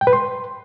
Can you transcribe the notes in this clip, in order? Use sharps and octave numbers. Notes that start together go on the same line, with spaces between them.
G5
B4
C6